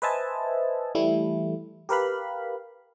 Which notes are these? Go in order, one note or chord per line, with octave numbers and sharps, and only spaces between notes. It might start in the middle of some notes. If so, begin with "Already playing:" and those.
B4 C5 D#5 E5 G#5 A5
E3 G3 A3 E4
G4 A#4 B4 F5 B5